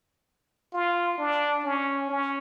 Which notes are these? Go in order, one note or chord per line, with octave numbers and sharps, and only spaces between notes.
F4
D4
C#4
C#4